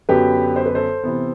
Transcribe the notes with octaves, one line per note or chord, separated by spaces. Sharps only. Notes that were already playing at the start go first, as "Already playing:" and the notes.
F#2 D3 F#3 B3 G4 B4
C5
B4
A4 C5
C3 E3 B3